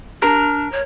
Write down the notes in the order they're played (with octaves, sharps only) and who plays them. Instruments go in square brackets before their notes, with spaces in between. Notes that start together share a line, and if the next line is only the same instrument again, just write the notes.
[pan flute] D4 [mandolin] A#4
[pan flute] C#5